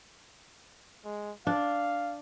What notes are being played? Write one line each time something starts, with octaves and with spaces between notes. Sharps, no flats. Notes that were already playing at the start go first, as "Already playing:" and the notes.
G#3
D4 F5